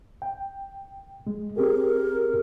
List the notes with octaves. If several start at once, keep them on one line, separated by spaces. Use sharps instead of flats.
G5
G#3
C4 G4 G#4 A#4